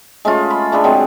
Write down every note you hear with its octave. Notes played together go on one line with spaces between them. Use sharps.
G#3 A3 C#4 F4
B5
A3 D4 G#4 B4
F#3 G#3 C4